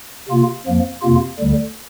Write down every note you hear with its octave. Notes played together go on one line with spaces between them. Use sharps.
C3 A#3 F4
F2 F3 A#3
F2 C3 A#3 F4
D2 D3 G3